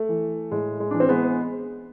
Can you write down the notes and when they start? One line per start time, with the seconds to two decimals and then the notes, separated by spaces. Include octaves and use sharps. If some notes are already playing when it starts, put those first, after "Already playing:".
Already playing: A3
0.09 E3
0.51 A2 G#3
0.80 G#3
0.91 E3 D4
1.00 C4
1.08 G#3 B3